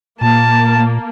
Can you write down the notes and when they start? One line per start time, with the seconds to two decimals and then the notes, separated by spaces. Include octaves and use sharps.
0.21 A#2 A#3 A5